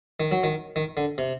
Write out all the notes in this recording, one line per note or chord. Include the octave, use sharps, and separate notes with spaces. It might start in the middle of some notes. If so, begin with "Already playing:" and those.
D#3
F#3
D#3
D#3
D3
C3